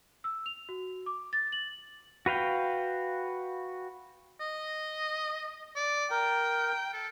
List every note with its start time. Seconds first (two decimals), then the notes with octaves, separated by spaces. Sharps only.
0.24 E6
0.46 F7
0.69 F#4
1.06 D6
1.33 A6
1.52 F#7
2.26 F#4 B4 F5 G5
4.40 D#5
5.76 D5
6.11 A#4 G5
6.93 A4